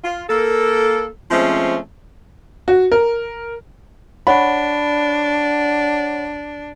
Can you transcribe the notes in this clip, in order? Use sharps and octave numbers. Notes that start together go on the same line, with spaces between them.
F4
A#3 A4
F3 G#3 A3 C4 C#4
F#4
A#4
D4 C#5 F#5 B5